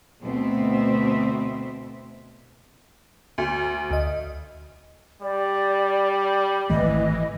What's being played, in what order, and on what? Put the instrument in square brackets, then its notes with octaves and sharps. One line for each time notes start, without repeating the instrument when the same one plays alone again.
[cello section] D2 B2 A3 C4 E5
[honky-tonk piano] D2
[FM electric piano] D2 D#5
[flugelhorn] G3 [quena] D5
[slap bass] G#1 A3 [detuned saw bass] E3 [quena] D#5